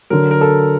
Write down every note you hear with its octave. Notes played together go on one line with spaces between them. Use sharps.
D3 F#3 A#4
A#4
A4